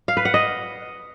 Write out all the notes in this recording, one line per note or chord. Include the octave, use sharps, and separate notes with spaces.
F5
B4
F#5
D#5